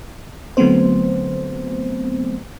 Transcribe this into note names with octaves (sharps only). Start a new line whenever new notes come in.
D3 F#3 A3 B3 C4 C5